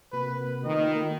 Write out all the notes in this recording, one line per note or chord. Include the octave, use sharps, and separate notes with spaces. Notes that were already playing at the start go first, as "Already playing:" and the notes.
C3 A#3 F#4 B4
D#3 A3 A#3 F4 D#5